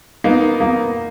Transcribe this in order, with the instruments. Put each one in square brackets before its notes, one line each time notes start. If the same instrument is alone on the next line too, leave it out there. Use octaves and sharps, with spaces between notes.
[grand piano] A#3 [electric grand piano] B3 D#4
[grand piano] A#3